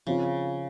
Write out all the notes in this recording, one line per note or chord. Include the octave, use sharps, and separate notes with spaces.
C#3 F3 C4 F4